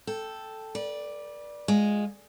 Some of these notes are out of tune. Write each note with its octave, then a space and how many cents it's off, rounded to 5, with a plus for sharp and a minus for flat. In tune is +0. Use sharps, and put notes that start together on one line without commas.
A4 +0 G5 +0
B4 -35 D5 +0
G#3 +0 F4 +20